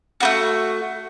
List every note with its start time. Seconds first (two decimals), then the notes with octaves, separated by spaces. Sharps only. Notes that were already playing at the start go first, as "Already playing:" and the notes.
0.20 A3 B3 F#4